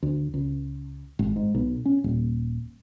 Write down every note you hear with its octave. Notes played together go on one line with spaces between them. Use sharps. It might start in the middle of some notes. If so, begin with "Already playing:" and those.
D2
C#2
G#1
G#2
B1
C#4
D#1